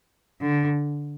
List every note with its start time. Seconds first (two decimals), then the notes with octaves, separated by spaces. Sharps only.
0.42 D3